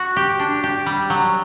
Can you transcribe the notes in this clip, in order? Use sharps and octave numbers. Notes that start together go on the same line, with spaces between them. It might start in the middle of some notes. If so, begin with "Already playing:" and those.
Already playing: F#4
G4
D4
G4
G3
F#3